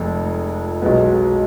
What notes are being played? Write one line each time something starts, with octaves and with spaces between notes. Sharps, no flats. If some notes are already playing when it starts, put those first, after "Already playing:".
Already playing: F1 F2 F3 G#3
B1 B2 G#3 B3